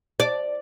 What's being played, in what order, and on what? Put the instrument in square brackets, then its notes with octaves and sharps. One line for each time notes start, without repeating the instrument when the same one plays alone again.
[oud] D5